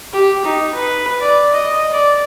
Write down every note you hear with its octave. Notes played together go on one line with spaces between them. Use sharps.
G4
D#4
B4
D5
D#5
D5